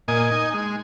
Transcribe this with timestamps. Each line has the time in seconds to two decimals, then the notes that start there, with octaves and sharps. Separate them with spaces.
0.08 A#2 D#5 G#5
0.31 D#4
0.54 G#3